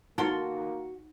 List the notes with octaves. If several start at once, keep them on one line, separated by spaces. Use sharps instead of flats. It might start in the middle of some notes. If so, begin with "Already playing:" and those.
A#3 D#4 F#4 A4 A#4 C6